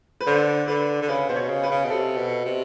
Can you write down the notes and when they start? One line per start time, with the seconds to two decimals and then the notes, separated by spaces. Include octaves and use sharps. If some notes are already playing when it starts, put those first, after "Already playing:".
0.21 B4
0.27 D3 C5
0.68 D3 B4
1.02 D3
1.09 C#3 B4
1.29 B2 C5
1.36 C#5
1.50 C#3
1.63 B4
1.70 C#3
1.85 B2
1.90 C3 A4
2.17 B2
2.45 C3